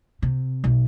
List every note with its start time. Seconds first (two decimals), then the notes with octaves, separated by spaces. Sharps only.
0.22 C3
0.64 B1